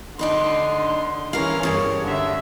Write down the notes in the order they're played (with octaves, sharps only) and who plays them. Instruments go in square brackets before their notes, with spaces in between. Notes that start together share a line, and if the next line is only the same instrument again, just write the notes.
[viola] D3 C6 [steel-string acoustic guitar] D4 D#4 B4
[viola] E3 C#4 [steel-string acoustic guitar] A#4 F5
[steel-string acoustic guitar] G2 A#2 C#3 [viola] C#5
[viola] D3 E5